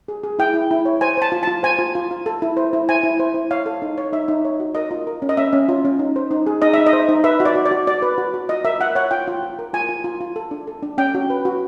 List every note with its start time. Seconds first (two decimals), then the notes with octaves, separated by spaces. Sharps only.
0.08 G#4
0.23 G#4
0.39 E4 G5
0.54 E4
0.71 E4
0.85 C#5
1.01 C5 G#5
1.17 C5 A5
1.32 F4
1.43 F4 A5
1.63 C5 G#5
1.79 F4
1.95 F4
2.11 F4
2.26 A4
2.42 E4
2.57 C5
2.73 E4
2.89 C5 G#5
3.03 E4
3.20 C5
3.34 E4
3.51 C#5 F5
3.66 A4
3.82 D#4
3.98 C#5
4.13 D#4 E5
4.28 D#4
4.45 C#5
4.60 F#4
4.75 A#4 D#5
4.91 F4
5.07 A#4
5.22 C#4
5.29 D#5
5.37 C#4 E5
5.53 C#4
5.69 F4
5.85 C#4
5.99 D#4
6.16 C5
6.31 D#4
6.47 G#4
6.62 D#4 D#5
6.74 D#4 E5
6.87 D#5
6.93 C5
7.09 D#4
7.24 B4 E5
7.40 F#4
7.45 D5
7.55 F#4
7.66 D5
7.71 F#4
7.87 F#4 D5
8.02 B4
8.18 F#4
8.34 F#4
8.49 F4 D#5
8.65 A#4 E5
8.80 F4 F#5
8.95 C#5 F#5
9.11 F4 G5
9.28 F4
9.43 F4
9.59 A#4
9.74 F4 G#5
9.89 F4
10.04 F4
10.21 F4
10.36 A4
10.51 D4
10.67 A4
10.83 D4
10.98 C#4 G5
11.15 F#4
11.30 B4
11.45 F#4